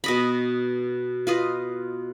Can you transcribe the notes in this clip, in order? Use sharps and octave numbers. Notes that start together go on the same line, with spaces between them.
B2 D#5 B5
F4 B4 D#5